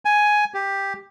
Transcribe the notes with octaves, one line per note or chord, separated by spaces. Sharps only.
G#5
G4